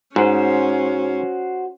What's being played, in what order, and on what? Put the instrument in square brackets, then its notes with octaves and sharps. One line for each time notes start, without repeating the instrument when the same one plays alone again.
[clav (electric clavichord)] G#2 [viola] C#4 [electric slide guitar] F#4 C5